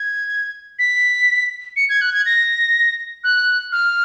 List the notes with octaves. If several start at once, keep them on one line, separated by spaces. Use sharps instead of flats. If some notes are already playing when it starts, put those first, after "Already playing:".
Already playing: G#6
B6
C#7
G#6
F#6
G#6
A#6
F#6
F6